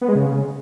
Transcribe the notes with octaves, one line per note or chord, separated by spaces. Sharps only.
B3
G#3
C#3